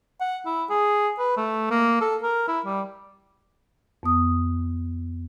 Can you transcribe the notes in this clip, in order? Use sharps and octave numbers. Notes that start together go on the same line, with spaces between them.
F#5
E4
G#4
B4
A3
A#3
A4
A#4
E4
G3
F2 B3 D#6